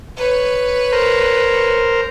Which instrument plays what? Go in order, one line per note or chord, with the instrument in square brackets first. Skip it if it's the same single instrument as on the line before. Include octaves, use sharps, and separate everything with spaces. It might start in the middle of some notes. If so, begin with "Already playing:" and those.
[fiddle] B4 C#5
[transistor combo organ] A#4 C5